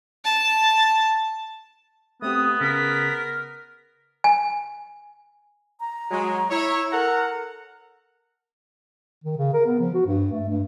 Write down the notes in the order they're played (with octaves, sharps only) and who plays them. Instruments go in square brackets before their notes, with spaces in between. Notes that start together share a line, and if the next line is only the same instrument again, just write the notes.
[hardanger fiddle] A5
[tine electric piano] A3 C4 G4 [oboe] B3 [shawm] D#6
[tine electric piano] C#3 [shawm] A#4 [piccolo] B6
[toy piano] G#5
[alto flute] A#5
[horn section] F#3 G#3
E4 C#5
[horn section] A4 F#5 A#5 [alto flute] A#4
[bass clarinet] D#3
C#3
A#4
B3
F3
F#4
G2
A3
G2